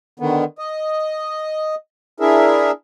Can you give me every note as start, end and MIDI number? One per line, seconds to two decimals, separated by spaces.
0.20 0.44 50
0.20 0.44 51
0.20 0.44 59
0.58 1.75 75
2.20 2.71 62
2.20 2.71 64
2.20 2.71 68
2.20 2.71 70
2.20 2.71 76